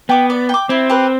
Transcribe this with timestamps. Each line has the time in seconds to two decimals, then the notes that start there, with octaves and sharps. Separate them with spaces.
0.09 B3 G5 D6
0.30 D5
0.49 G5 D6
0.69 C4 E4
0.89 G4 B4